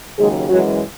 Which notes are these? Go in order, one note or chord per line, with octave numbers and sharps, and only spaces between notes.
D#2 C#3 F#3 G#3 G#4
F#2 E3 F#3 G#3 F#4